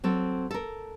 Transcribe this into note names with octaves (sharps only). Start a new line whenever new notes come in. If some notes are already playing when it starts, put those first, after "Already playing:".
F#3 C4 A4
A4 A#4